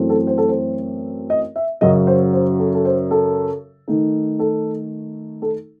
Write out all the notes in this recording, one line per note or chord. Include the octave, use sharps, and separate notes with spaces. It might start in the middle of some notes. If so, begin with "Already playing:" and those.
Already playing: F#2 E3 A3 C4
A4
C5
A4
C5
D#5
E5
F#2 C#3 F#3 D#5
C5
C5
A4
A4
C5
A4
D#3 A3 D#4
A4
A4